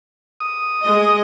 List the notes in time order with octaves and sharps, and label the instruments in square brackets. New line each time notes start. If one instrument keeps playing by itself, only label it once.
[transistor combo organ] D#6
[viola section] G#3 D#5